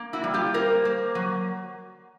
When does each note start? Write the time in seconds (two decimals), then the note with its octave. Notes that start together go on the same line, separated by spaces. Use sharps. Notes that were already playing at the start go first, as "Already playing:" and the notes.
Already playing: A#3
0.13 E4 F#4
0.24 G3
0.34 F4 G4
0.54 A#3 A#4 C5
0.85 A#3
1.15 F#3